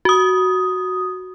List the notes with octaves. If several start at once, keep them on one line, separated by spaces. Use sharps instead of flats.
F#4 D#6